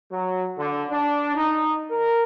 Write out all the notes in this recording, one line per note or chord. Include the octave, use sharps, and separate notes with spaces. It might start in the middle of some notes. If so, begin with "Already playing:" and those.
F#3
D3
D4
D#4
A#4